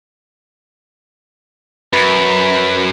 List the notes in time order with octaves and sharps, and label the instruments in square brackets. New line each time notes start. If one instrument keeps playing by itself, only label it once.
[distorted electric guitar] F#2 [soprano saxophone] B4